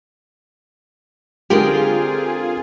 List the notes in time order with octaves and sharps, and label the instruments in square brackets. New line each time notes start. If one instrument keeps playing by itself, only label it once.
[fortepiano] D3 G4 [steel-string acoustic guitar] G#3 C4 A#4 [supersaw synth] F4 G#4